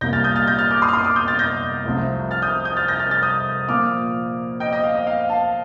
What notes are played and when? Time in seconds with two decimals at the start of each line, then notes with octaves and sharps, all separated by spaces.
0.01 C2 A#2 G3 A#3 G6 A#6
0.13 F6 A6
0.24 D#6 G6
0.36 F6 A6
0.47 G6 A#6
0.58 F6 A6
0.70 D6 F6
0.82 C6 D#6
0.89 F6
0.93 C6 D#6
1.04 D6 F6
1.16 D#6 G6
1.28 F6 A6
1.39 G6 A#6
1.85 C2 C3 F3 A3
2.31 F6 A6
2.42 D#6 G6
2.65 D#6 G6
2.77 F6 A6
2.88 G6 A#6
2.99 F6 A6
3.11 F6 A6
3.22 D#6 G6
3.68 A#2 F3 A#3 D6 F6
4.60 D#5 G5
4.72 D#5 G5
4.84 F5
4.95 D#5
5.07 F5
5.29 F5 A5